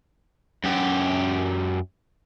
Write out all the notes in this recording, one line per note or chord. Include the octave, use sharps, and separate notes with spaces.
F#2 G4